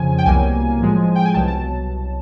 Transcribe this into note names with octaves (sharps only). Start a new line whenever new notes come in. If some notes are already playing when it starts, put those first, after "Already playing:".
Already playing: F2 C#3 F3 G#5
G5
C2 B2 F#3 A#3 G#5
A2 F3 G#3
G5
G#5
C2 B2 F#3 A5
A5